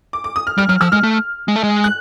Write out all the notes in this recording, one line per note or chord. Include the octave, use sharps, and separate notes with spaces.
D6
D6
D#6
F6
G3 F6
F#3 F6
F3 E6
G#3 F6
A3
G#3
A3
G#3
F#6